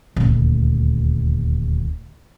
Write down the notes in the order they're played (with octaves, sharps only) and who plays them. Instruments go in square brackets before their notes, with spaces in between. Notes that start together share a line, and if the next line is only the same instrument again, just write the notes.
[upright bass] D#1 D2